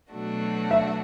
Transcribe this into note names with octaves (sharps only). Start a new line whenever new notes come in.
B2 F#3 A3 D4 F#4
E5